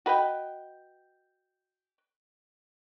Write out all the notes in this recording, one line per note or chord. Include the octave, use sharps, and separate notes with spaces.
F#4 B4 D#5 G5